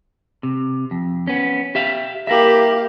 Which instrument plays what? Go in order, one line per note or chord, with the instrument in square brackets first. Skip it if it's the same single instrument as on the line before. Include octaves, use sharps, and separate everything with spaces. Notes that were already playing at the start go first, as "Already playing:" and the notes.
[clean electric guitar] C3
F2
B3 C#4
G4 E5 F5
[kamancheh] A#3 G4 [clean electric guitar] E4 A#4 E5